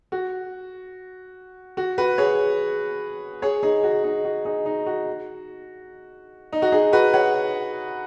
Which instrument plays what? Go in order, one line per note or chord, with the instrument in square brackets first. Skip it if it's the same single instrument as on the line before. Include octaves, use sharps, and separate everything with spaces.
[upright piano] F#4
F#4
F#4 B4
G#4 C#5
G#4 C#5
D#4 G#4
F#4
D#4
F#4
D#4 G#4
D#4
F#4
D#4
F#4
D#4 G#4
F#4 B4
C#5 F#5